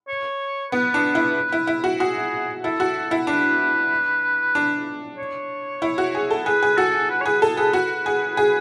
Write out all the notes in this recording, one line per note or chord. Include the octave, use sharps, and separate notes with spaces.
C#5
B3 B4
D4
E4
E4
E4
F#4
F#4 G#4
E4 A4
F#4
E4
D4 B4
D4
C#5
E4
F#4
G#4
A4
G#4 B4
G#4
F#4 A4
B4
C#5
G#4 B4
A4
G#4 B4
F#4
G#4
G#4